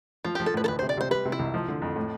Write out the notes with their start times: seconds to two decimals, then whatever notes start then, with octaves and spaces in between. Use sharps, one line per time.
0.25 F3 F4
0.35 F3 G4
0.46 A4
0.54 A2 B4
0.64 A4
0.68 D2 B4
0.79 C3 C5
0.89 D5
0.97 C3 C5
1.11 G3 B4
1.25 C3
1.32 E4
1.39 C2
1.54 F3
1.68 D3
1.82 F2
1.96 A2